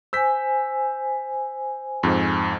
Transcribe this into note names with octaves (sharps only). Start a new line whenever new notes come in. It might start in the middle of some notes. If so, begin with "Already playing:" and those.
C5 G#5 E6 G6 B6
F2 G#2